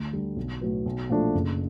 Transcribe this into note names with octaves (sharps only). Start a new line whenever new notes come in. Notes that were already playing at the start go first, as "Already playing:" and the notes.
Already playing: D2
D3 G3
B1
A2 F#3 B3
B1
A#2 F3 A3 D4
F#1